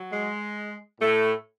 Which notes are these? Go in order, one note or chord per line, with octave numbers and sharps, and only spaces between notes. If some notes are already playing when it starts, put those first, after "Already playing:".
Already playing: F#3
G#3
A2 A3